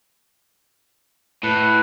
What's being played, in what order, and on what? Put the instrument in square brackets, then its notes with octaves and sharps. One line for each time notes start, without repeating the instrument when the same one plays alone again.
[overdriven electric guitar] A2 [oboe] B4